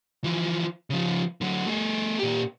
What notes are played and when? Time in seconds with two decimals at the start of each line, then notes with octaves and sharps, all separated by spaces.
0.24 E3 F3
0.90 C#3 F3
1.41 D3 F#3
1.67 A3 G#4
2.19 A#2 G4